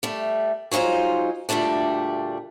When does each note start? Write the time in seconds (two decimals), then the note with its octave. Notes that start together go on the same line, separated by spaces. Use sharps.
0.03 G3 A3
0.71 F#3 G#3 D#4 F4 C5
1.49 D2 A#2 G3 A3 D4